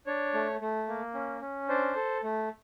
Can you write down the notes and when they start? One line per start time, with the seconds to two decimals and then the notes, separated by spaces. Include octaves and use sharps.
0.06 D4 C#5
0.34 A3
0.61 A3
0.88 A#3
1.14 C#4
1.41 C#4
1.68 D4 C5
1.96 A4
2.23 A3